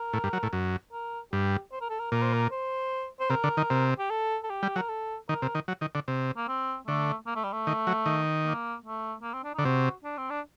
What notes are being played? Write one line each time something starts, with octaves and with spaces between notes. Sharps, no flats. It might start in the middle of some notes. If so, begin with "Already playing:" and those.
Already playing: A#4
A2
G2
F#3
A2
F#2
A#4
G2 G4
C5
A#4
A4
A#4
A#2 A#4
C5
A#4
C5
C5
C3 A#4
D3
D#3
C3
G4
A4
A4
G4
G3
F#3 A#4
A4
D#3 A#4
C3
D#3
F#3
D#3
D3
C3
A#3
C4
D3 A3
A#3
A3
G3
A3
D#3
F#3
D#3
A#3
A3
A#3
C4
D4
D3 D#4
C3 F#4
D4
C4
D4